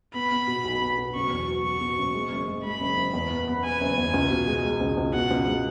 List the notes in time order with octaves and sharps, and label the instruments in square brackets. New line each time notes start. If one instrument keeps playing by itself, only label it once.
[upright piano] B3 [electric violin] B5
[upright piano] B3
B2
B1
B3
B2
[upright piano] F#1 [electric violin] C#6
[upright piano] E2
F#3
[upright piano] F#3 [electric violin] C#6
[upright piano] B2
F#1
G#3
F#1
G#3
[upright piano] G#3 [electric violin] B5
[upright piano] F#1
F#1
E2
B3
B3
[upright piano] B3 [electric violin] G#5
[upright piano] F#1
E2
C#2
B2
G#3
G#3
C#2
C#2
[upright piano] B2 [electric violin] F#5
[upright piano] C#2
G#3